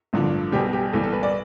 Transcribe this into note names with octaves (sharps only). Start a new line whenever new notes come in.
A1 G2 D3 F3
B1 B2 G3 G4
G4
B1 A2 E3 G3 A4
A4
B4
D5